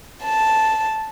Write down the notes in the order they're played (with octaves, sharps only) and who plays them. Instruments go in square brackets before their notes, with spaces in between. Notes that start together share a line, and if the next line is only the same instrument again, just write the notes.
[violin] A5